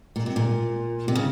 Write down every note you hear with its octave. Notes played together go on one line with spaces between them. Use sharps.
A#2
C3
A#2
C3
C#3